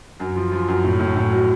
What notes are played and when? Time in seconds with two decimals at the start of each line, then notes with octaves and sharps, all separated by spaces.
0.20 F#2
0.36 F3
0.52 F3
0.68 F#2
0.84 A2
0.99 A2
1.16 A2
1.32 F#3